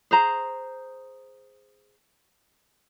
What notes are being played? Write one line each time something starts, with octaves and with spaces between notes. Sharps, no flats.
G#4 C5 A#5